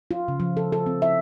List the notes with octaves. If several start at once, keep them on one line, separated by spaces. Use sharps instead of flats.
F4
C#3
F3
A4
A4
C4
E5